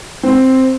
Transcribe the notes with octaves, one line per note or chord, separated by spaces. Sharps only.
C4